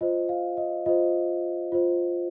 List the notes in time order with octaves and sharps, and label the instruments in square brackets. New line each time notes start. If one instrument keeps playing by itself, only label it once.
[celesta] F4 C5 D#5
F5
D#5
F4 C5 D#5
F4 C5